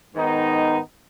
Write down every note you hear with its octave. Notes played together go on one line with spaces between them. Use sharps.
G#2 D#3 B3 D#4